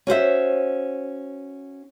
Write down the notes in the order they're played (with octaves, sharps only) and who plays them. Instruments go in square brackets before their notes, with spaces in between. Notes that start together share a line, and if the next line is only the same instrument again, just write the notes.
[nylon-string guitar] C#4 F#4 C5 E5